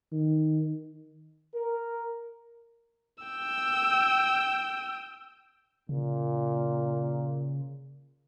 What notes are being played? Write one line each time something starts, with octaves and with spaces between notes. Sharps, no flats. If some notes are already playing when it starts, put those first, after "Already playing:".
D#3
A#4
G5 E6
A#2 C#3